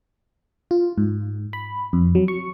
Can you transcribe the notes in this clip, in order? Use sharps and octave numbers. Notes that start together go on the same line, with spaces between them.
F4
G#2
B5
F2
F#3
C#6